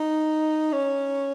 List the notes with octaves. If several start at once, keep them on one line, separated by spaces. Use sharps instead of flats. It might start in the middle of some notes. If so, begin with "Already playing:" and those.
Already playing: D#4
C#4